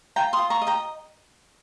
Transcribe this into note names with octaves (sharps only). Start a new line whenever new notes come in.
F4 G5 A#5
C6 D#6
F4
A#5 C#6
D#5
G5 A#5